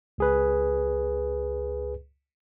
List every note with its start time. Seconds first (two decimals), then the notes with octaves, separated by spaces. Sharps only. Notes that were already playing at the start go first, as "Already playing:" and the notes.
0.18 C#2 G#4 B4